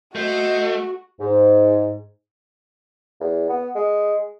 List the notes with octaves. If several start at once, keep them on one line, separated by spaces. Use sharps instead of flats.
A3 F#4 C5 D#5
G#2
E2
B3
G#3